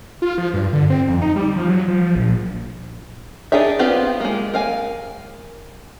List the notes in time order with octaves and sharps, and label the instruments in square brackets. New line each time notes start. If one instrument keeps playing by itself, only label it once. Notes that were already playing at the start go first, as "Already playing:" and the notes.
[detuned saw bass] F4
F3
G2
D3
C4
F2
D#4
G3
F3
F#3
F3
A#1
[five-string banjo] D4 D#4 G#4 C#5 E5
B3 C4 F4 G4 F5
G#3 A#3
A#4 F5 G#5